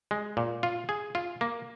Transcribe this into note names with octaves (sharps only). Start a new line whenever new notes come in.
G#3
A#2
F4
G#4
F4
A#3